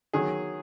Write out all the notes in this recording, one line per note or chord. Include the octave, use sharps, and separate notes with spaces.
D#3 F#3 G#4